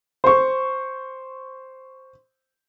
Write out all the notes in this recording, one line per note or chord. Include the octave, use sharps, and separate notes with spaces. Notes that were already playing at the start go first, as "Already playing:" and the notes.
C5 C#6